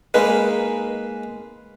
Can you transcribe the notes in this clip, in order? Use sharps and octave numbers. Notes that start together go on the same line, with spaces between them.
G#3 A#3 D#4 B4